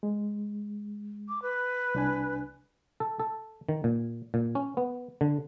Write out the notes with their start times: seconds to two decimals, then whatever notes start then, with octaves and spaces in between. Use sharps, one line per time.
0.03 G#3
1.29 D6
1.42 B4
1.95 C2 D4 G#5
3.00 A4
3.20 A4
3.69 D#3
3.84 A#2
4.34 A#2
4.55 C#4
4.77 B3
5.21 D3